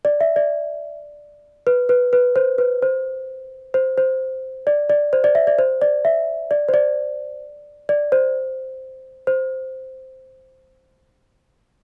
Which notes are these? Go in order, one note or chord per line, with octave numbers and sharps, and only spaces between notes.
D5
E5
D5
B4
B4
B4
C5
B4
C5
C5
C5
D5
D5
C5
D5
E5
D5
C5
D5
E5
D5
C5
D5
D5
C5
C5